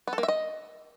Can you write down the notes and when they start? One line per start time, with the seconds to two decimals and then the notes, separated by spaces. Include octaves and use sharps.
0.07 B3
0.13 A4
0.18 A#3
0.23 E5
0.28 D#5